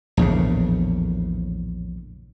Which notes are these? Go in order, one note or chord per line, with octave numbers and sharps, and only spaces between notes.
A#1 E2 A2 C#3